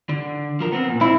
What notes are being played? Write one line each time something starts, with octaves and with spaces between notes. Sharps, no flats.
D3
F3 A#4
B3 C4
A#2
C4 E4